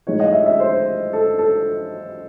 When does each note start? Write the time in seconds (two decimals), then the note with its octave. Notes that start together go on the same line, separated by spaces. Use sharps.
0.07 A2 G#3 D#4 C#5
0.20 D#5
0.32 E5
0.46 E5
0.60 C5
1.13 A4
1.39 A4